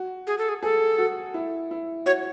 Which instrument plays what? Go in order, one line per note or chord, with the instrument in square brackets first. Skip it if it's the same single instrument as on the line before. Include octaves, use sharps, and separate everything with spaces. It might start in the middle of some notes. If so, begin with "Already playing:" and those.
Already playing: [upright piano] F#4
[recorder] G#4
A4
G#4
[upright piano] G#4 [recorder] A4
[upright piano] F#4
E4
E4
[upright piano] F#4 [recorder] C#5